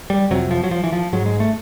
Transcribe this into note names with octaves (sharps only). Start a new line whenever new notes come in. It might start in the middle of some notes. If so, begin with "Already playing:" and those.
G3
F2 C3 F#3
F3
F#3
F3
E3
F3
G#2 F#3
G#3
A3